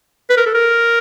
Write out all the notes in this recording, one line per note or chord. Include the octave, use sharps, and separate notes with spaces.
B4
A#4
A4
A#4